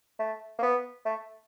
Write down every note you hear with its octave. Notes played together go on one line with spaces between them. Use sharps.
A3
A#3
B3
A3